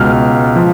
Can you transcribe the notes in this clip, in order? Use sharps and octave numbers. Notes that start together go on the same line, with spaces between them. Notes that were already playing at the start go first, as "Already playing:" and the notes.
Already playing: C#2 B2 F6
F3